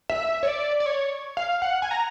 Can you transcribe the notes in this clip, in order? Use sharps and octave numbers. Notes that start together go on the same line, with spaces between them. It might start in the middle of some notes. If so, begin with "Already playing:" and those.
E5
C#5
D5
D5
C#5
F5
F#5
G#5
A#5